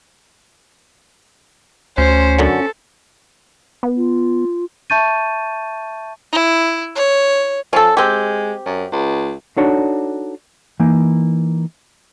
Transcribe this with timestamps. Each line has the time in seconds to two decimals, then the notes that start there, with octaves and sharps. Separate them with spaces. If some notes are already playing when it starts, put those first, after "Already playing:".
1.98 D2 C#4 C5
2.39 F#2 D3 F#3 A4
3.83 B3
3.97 F4
4.90 E5 A5 C#6 G6 A6 D#7
6.32 E4
6.95 C#5
7.73 F3 C#4 A4
7.97 G#3 C4 G4
8.66 F#2
8.92 C#2
9.57 D4 D#4 F#4 A4 C#5 D5
10.80 E3 A#3 D#4